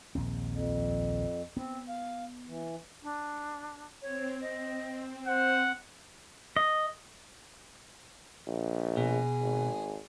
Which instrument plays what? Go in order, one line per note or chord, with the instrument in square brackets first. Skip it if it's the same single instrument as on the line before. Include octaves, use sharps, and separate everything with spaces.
[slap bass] A#1 D#2 C4
[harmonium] F2
[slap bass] B3 [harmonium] C4
[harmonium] F5
E3
[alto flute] D4
[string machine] C4 [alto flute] C#5
[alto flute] D#5
[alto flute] C5 [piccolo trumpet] F#5
[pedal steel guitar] D#5
[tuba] A#1
[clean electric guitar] B2 [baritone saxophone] G#4
[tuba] G#1